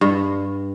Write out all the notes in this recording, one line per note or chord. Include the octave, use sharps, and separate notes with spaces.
G2